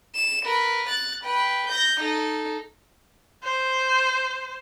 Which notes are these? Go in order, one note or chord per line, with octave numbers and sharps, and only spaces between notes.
E7
A#4 B4
F#6 A6
B4 G5
G6 A#6
D#4 A4
C5